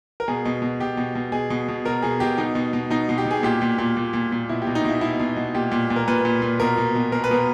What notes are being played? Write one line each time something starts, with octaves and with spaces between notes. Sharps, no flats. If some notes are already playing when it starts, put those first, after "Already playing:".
A#4
B2 G#4
B2
B2
B2 G4
B2
B2
B2 G#4
B2
B2
B2 A#4
B2 G#4
B2 G4
B2 D#4
B2
B2
B2 D#4
B2
G4
B2
G#4
A#2 G4
A#2
A#2
A#2
A#2
A#2
B2 E4
G4
B2
D#4
B2 E4
B2 E4
B2
B2
A#2 G4
A#2
A#2
A#4
A#2 B4
A#2
A#2
B2 A#4
B2
B2
B2 A#4
B4
B2 A#4